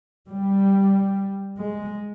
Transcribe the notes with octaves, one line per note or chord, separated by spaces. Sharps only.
G3
G#3